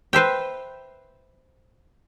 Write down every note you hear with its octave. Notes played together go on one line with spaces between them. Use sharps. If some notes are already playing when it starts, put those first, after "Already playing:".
B4 C5 E5 G5